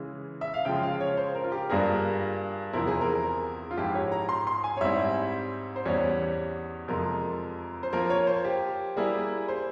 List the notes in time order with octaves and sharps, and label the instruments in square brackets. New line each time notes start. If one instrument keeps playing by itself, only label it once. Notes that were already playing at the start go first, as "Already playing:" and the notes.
Already playing: [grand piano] C#3 E3 G#3
[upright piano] E5
F5
[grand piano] C#3 F3 G#3 [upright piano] G5
[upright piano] F5
C#5
C5
A#4
F4
G4
[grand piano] G2 G3 A#3 F4 A#4 [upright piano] G#4
[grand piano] E2 C3 F3 C4 E4 [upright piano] A#4
[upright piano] G#4
A#4
F4
[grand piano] G#2 F3 G#3 E4 [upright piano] G4
[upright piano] C#5
A#5
C6
C6
G#5
C#5
[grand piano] G#2 G3 C4 E4 [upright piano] E5
[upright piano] C5
[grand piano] E2 E3 G3 C#4 [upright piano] C#5
[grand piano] F2 C3 F3 G#3 [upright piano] A#4
[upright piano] C5
[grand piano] F3 A#3 F4 [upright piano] A#4
[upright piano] C#5
C5
G4
[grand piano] G3 A#3 E4 [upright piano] G#4
[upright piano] C5